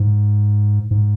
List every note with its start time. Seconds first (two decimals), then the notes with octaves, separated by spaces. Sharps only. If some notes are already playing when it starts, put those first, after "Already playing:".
Already playing: G#2
0.91 G#2